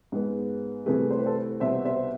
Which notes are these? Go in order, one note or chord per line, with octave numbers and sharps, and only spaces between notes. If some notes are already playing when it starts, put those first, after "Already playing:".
G#2 G#3 B3
C2 C3 E3 A3 G#4 B4
C5
B4
A4 C5
C2 B2 B3 C5 E5
C5 E5